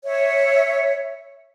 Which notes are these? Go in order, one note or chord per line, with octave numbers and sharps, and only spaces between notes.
C#5 E5